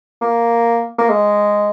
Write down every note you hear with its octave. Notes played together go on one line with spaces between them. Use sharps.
A#3
A#3
G#3